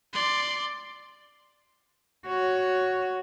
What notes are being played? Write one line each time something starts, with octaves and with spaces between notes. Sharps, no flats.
D5 C6
F#4 C#5